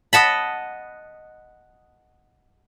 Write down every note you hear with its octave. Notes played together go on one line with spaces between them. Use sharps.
D#5 F#5 A5 B5